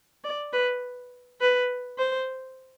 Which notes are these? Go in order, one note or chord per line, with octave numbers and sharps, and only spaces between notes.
D5
B4
B4
C5